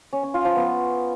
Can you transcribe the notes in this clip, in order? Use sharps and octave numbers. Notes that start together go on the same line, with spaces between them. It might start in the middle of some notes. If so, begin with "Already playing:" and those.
C#4
C#4
F4
F3
B3